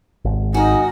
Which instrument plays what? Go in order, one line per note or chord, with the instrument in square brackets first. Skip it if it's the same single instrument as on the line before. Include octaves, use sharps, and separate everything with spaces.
[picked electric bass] G#1
[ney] D#4 [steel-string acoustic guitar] F#4 A#4 [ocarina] G#5